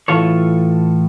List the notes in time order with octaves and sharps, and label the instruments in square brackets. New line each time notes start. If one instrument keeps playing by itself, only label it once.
[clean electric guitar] A2 E3 F4 A4 C#5